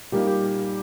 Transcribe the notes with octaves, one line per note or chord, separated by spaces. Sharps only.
A#2 G3 A#3 D#4 G4
G4